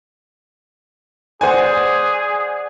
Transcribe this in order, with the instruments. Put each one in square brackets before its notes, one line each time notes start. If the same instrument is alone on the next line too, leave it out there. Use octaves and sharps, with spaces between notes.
[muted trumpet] G#4 [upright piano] C5 G#5 [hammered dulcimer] D5 F#5